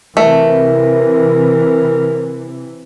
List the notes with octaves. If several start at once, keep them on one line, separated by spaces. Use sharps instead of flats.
C3 E3 A3 A#4